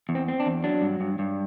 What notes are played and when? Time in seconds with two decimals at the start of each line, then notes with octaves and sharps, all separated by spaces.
0.09 E2
0.15 C4
0.28 C4
0.40 D4
0.46 E2
0.64 F#3 D4
0.82 G2
1.00 G2
1.19 G2